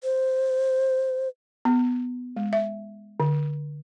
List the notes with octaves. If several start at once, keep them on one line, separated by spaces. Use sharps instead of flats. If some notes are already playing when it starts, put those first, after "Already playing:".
C5
B3
G#3
E5
D3